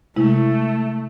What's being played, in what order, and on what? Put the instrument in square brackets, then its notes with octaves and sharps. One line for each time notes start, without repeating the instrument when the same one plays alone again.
[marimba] C3 G#3 E4 [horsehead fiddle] A3